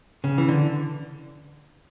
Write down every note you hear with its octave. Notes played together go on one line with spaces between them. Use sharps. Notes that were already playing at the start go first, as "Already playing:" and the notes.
C#3
E3
D3